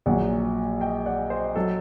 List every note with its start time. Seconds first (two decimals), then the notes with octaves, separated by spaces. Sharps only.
0.06 A#1 A#2 F#3 D5 F#5
0.80 D#5 G5
1.06 D5 F#5
1.30 C5 D#5
1.56 F#3 A4